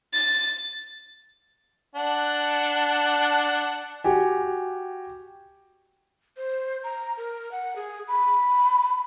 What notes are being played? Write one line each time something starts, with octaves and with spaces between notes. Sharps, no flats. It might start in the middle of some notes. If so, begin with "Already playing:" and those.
A6
D4 F#5 A5
F#4 G4 G#5
C5
A#5
A#4
F#5
G#4
B5